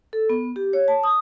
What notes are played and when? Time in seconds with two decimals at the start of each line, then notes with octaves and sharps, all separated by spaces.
0.13 A4
0.29 B3
0.56 G4
0.73 C#5
0.88 A5
1.04 D#6